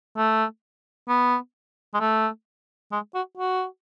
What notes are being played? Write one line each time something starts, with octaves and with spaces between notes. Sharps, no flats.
A3
B3
G#3
A3
G#3
F#4
F#4